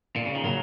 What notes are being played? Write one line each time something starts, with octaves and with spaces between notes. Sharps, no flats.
A#2
C#3
D#3
C#3 F#3 A#3 C#4